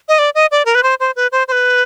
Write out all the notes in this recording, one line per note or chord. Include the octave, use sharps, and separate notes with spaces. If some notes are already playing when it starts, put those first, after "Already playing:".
D#5
D5
D#5
D5
A#4
B4
C5
C5
B4
C5
C5
B4